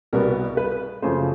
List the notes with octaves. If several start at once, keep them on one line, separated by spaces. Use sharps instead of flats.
C2 B2 G3 B3 A#4
B4
F#2 C#3 F3 A3 C5